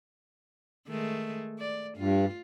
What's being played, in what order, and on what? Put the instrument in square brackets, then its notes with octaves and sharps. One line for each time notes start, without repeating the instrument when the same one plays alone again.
[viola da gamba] D#3 G#3 A3
D5
[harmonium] G2 [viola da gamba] F4